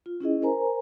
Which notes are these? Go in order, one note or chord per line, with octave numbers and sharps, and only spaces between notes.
F4
C#4 E4 G#4 D#5
A#4 C5 G#5 A#5